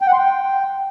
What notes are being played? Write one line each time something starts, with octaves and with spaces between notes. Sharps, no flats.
G5
F#5
C6
G5